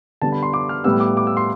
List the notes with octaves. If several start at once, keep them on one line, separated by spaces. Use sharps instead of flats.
D3 G3 B3 A5
B5
C6
D6
F6
A2 G3 B3 E6
D6
D6
E6
C6